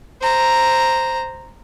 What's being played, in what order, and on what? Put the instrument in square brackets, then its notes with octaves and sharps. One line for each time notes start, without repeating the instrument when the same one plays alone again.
[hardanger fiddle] C5 A#5